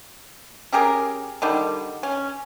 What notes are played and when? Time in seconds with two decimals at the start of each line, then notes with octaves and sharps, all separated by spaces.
0.72 C#4 G4 G#4 A#4
1.42 D3 D#3 G3
2.03 C#4